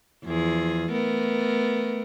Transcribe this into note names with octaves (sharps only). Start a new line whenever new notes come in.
E2 F3 G#4
A3 B3 A#4